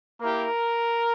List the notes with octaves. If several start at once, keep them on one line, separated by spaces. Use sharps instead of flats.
A#3 E4 G4 A#4